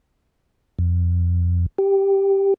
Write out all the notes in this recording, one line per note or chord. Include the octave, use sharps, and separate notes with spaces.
F2
G4